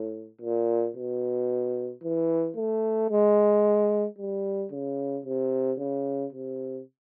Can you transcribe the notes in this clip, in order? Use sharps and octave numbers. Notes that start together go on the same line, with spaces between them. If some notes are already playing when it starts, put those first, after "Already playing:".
Already playing: A2
A#2
B2
E3
A3
G#3
G3
C#3
C3
C#3
C3